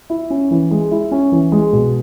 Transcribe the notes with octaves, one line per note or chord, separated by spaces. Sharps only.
E4
C#4
E3
G#3
E4
C#4
E3
G#3
B2